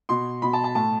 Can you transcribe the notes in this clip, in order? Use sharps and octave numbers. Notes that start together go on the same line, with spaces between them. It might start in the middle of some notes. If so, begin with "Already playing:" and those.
B2 C6
B2 B5
A5
A5
A2 A5